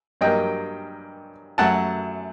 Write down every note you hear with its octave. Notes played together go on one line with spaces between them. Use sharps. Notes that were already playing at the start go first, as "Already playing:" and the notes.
G2 F#3 A#3 D#5 G5
F#2 F#3 A3 F#5 A5